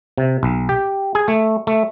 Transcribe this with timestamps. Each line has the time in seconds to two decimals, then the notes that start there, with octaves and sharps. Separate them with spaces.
0.18 C3
0.43 B1
0.69 G4
1.15 G#4
1.28 A3
1.67 A3